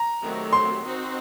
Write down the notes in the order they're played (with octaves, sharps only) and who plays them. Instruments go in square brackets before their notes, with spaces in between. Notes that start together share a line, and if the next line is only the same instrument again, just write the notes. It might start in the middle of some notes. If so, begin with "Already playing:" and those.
Already playing: [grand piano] A#5
[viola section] D#3 F#3 A3 C4 G4
[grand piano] C6
[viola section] C4 D#4 F#4 C5